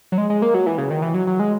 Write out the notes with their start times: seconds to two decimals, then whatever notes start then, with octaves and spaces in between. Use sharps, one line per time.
0.12 F#3
0.18 G#3
0.30 G#3
0.42 A#3
0.54 F#3
0.66 E3
0.78 C#3
0.91 D#3
1.02 E3
1.14 F#3
1.27 F#3
1.40 G#3